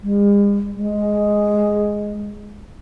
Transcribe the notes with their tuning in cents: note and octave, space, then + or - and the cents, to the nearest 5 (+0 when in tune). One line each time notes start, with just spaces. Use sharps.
G#3 -45
G#3 +0